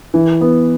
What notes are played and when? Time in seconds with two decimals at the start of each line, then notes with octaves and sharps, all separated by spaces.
0.14 E3
0.41 B3